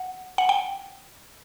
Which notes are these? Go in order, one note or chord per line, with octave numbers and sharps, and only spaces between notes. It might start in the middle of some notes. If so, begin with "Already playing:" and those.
Already playing: F#5
F#5
G5